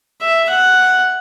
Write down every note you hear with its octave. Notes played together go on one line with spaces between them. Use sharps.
E5
F#5